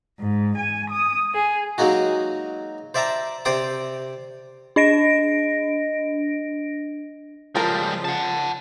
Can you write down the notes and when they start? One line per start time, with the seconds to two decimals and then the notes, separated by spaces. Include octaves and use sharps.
0.20 G#2
0.58 G#5
0.91 D#6
1.34 G#4
1.78 F#3 G#3 A#3 D#4 F#4
2.94 C5 D5 E5 G5 A5 A#5
3.45 C3 C5 D5 G5 C6 D#6
4.76 D4 D#5 A#6 D7
7.55 C#3 F3 G3 G#3 F4 A4 A#4
8.05 F#5 A5